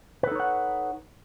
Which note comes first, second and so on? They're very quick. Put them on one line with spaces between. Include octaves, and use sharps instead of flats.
B4 A4 D#4 C#5 F#5